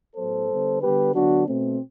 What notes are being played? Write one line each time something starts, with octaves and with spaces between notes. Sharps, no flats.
A2 F#3 B3 A4 C5
D3 G3 B3
D3 G3 B3 G4 B4
D3 F#3 B3 D4 F#4
B2 A3 C4